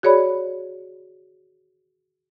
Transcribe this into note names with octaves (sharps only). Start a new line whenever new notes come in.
F#4 G#4 C#5 D5 B5